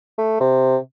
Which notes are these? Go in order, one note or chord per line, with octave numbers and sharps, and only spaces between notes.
A3
C3